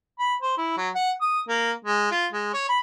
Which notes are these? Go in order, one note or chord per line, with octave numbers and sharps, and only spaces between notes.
B5
C5
E4
F#3
F#5
D#6
A#3
G#3
F4
G#3
C#5
B5